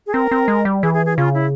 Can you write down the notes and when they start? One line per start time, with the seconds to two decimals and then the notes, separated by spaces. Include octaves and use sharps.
0.07 G#4
0.13 C4 A#4
0.31 C4
0.48 G#3
0.65 G3
0.83 E3 G#4
0.94 G#4
1.06 G#4
1.17 C#3 F4
1.34 E4